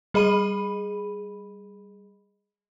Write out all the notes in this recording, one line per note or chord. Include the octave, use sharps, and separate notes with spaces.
G3 G#4 D#5 B5 D#7